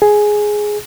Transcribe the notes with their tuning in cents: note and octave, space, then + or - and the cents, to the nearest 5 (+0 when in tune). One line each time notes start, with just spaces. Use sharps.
G#4 +5